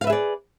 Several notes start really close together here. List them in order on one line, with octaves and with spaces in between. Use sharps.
F5 B4 E5 G#4 D5